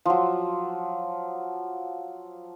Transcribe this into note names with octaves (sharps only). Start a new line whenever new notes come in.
F3 F#3